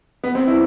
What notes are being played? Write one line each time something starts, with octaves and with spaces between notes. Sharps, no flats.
B3
C4
E4